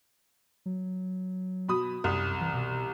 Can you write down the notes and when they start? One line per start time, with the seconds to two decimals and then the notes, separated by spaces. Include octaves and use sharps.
0.66 F#3
1.68 B2 B5 D#6
2.04 C2 F#2
2.41 E3
2.54 B2